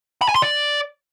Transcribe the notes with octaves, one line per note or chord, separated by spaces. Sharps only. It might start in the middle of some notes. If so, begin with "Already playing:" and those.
B5
G#5
C6
D5